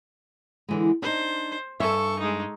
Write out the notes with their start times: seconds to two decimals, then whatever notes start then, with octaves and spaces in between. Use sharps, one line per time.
0.69 D3 E3 G#3
1.02 D4 D#4 C5
1.80 G2 A4 E5 G#5 C#6
2.19 G#3 D#4